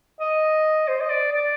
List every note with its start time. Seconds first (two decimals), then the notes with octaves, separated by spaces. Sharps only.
0.20 D#5
0.88 C5
1.01 D#5
1.10 D5
1.33 D5